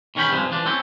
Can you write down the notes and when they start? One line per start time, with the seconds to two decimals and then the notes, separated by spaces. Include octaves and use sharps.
0.15 E2 D#3 C#4 A#4 G5 B5
0.31 G2 C3 F3 G#3
0.51 E3 F3 D4
0.66 A3 C4 C#4 E4